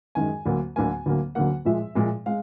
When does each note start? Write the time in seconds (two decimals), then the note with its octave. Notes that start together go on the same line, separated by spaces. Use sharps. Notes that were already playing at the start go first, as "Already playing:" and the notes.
0.15 F#2 D#3 G#3 G#5
0.45 D2 D3 F#3 A#3
0.76 D2 D3 F#3 A#3 G#5
1.06 D2 D3 F#3 A#3
1.35 D2 D3 F#3 A#3 F#5
1.65 A#2 F3 G#3 E5
1.95 A#2 F3 G#3
2.26 G#3 F5